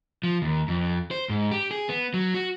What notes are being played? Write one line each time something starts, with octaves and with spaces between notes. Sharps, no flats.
F3
D#2
F2
C5
G#2
G4
G#4
B3
F#3
F#4